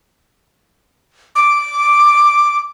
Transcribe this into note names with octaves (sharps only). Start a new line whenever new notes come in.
D6